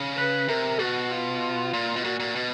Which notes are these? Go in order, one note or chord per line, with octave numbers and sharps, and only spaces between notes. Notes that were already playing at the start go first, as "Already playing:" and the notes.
Already playing: C#3
B4
C3 A#4
B2 F#4
F4
A#2
B2
A#2 F#4
A#2
B2